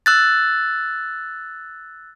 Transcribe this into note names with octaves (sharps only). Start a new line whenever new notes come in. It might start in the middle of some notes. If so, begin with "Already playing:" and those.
E6 F#6 A6